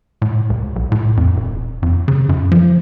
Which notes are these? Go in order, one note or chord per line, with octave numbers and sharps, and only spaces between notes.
A2
C#2
B1
A2
F2
D#1
F2
C#3
F#2
F3